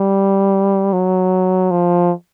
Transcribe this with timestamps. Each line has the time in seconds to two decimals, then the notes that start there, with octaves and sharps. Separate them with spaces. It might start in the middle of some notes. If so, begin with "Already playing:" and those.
Already playing: G3
0.93 F#3
1.71 F3